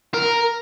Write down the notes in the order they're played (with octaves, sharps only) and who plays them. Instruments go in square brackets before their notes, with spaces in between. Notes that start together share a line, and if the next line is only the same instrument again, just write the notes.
[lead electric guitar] A#4